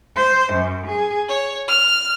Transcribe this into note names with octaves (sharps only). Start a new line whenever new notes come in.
C5
F#2
G#4
C#5
F6